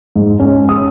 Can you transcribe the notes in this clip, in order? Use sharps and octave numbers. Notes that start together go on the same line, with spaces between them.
G#2
C#4
D#6